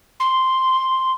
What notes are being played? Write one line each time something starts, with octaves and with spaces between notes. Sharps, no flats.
C6